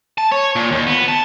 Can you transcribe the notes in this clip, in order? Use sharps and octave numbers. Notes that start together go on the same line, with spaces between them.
A5
C#5
A#2
D#2
B3
A5